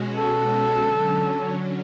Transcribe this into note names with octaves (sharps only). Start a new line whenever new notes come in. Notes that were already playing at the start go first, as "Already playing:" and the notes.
Already playing: B2 G#3 C#4 F#4
A4
D3 F#3 C#4